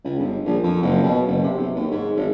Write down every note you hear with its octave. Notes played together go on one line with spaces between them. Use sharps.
C#2
G1
A#1
F2
F#1
B2
F#1
C3
B1
D#2
G#2
G#1